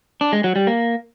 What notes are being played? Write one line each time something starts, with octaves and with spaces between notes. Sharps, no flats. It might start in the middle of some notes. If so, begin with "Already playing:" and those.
D4
G#3
F#3
G3
A#3